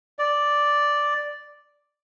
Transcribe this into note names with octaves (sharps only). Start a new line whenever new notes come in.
D5